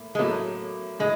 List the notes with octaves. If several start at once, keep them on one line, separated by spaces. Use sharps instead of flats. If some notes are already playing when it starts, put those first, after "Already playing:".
Already playing: A2 A#3
G#3
A2 F#3 A3 A#3
A2 G#3